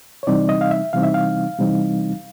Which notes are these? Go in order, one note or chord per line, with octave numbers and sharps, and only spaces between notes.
C#5
C3 E3 G3 C4 D#4 D5
D#5
F5
E5
C3 E3 G3 C4 D#4 F5
E5
F5
C3 E3 G3 C4 D#4